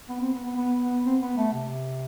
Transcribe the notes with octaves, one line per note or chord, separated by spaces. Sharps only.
B3
C4
B3
B3
B3
B3
C4
B3
A3
C3